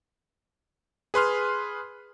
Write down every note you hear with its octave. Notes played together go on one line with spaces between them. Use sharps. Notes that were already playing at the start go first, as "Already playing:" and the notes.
G#4 B4 C6 F6